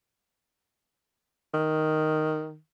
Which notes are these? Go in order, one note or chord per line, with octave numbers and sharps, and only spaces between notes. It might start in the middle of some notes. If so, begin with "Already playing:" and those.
D#3